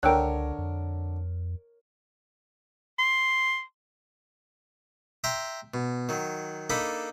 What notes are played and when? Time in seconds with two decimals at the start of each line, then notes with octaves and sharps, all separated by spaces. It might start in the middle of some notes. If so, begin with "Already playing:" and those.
0.03 C#2 D3 A#4 C#5 G5 E6 F#6
0.58 F2
2.99 C6
5.24 E5 G5 A#5 C6
5.74 B2
6.09 D#3 F#3
6.70 A#3 D4 D#4 A4 B5